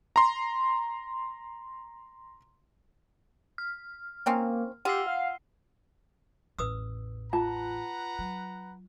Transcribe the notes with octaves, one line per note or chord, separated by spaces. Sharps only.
A#5 C6
F6
F3 A#3 C4 C#4
F4 G4 F#5 E6 C7
F5
A1 E2 B4 D#6 E6
F4 B4 F#5 A5 A#5
F#3